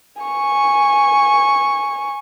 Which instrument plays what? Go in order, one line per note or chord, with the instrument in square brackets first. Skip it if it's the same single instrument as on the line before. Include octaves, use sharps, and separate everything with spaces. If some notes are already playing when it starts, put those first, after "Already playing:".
[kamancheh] G#5 C#6